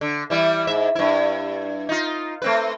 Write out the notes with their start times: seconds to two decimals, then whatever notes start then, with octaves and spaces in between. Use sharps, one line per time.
0.01 D3
0.30 E3 G3 E4
0.67 G#2 E5
0.95 G2 E4
1.89 D#4 F4
2.42 A3 C4 B4